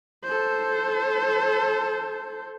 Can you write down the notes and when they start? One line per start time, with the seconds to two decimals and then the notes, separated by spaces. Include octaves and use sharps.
0.24 A4 C5